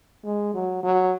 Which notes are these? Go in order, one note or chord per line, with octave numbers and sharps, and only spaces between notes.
G#3
F#3
F#3